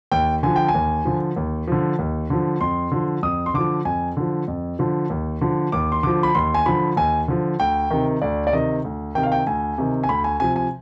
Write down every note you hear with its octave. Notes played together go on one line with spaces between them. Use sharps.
D#2 G5
D3 F3 G#5
G5
G#5
D#2
D3 F3
D#2
D3 F3
D#2
D3 F3
F2 C6
D3 F3
F2 D#6
C6
D3 F3 D6
F2 G#5
D3 F3
F2
D3 F3
D#2
D3 F3
D#2 D6
C6
D3 F3 D6
B5
D#2 C6
G#5
D3 F3 B5
D#2 G#5
D3 F3
D2 G5
C3 D#3
D2 D5
D5
C3 D#3 D#5
D2
C3 D#3 G5
F5
G5
D2 G#5
C3 D#3
G#5
D2 B5
G#5
C3 F3 G#5
G#5